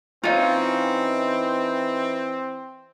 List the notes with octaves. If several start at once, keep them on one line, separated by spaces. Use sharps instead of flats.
E3 C4 C#4 D#4 F4